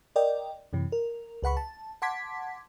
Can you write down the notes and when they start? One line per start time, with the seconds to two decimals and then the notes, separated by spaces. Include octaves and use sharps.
0.16 A#4 D5 D#5 G5
0.73 F#2 C3 E3
0.92 A#4
1.42 C#2 B4 F#5 B5 C#6
1.57 A5
2.02 F#5 A5 C6 D6 G#6 B6